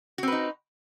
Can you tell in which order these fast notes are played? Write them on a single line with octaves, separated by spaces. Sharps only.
F#4 C4 B4 D#4